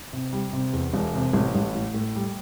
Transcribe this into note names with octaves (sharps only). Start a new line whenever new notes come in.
C3
G3
C3
E2
E1
C3
A1
A1
A2
A2
G3